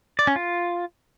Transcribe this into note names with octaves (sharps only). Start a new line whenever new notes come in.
D5
C#4
F4